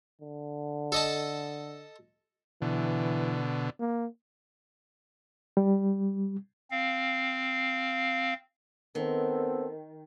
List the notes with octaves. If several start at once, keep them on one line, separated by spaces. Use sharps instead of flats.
D3
A4 D#5 A5
B2 D3 E3
A#3
G3
C4 F5
D#3 B3 C4 A4